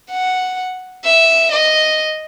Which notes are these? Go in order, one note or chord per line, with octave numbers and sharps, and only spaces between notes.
F#5
E5
D#5